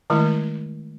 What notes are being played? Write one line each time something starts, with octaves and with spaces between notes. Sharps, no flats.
D#3 G#3 A3 E4